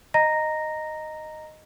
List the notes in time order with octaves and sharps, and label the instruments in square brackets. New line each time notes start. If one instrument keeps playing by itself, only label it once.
[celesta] D#5 A#5 A#6